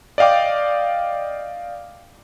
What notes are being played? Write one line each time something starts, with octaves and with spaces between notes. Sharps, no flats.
D5 D#5 F5 G5 D6